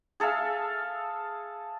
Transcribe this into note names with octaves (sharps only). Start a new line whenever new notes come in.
G#4 A4 E5 F5